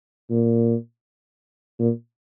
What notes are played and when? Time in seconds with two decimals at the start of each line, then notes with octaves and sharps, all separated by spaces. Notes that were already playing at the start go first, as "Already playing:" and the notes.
0.30 A#2
1.79 A#2